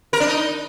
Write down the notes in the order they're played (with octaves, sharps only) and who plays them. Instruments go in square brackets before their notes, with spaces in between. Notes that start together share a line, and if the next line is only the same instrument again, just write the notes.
[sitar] A#4
D4
D#4